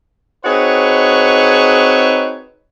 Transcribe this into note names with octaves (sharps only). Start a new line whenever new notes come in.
C4 D#4 F#4 G#4 B4 C#5